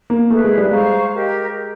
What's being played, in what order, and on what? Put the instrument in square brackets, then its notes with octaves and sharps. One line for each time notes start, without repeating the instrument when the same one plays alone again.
[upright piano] A#3
[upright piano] A3 [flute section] G#4 B4 E5
[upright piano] G#3
G3
[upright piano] G#3 [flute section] C5 F5 A#5 C#6
[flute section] G4 A#4 D#5